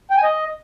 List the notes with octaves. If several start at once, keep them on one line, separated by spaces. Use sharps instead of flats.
G5
G#5
D#5